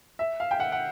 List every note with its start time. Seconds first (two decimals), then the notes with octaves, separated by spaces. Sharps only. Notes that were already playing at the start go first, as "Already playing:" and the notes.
0.19 E5
0.40 F5
0.51 G5
0.60 F#5
0.72 F#5